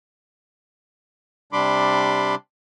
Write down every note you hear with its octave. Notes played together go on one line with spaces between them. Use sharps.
C3 G3 D4 B5 C6 D6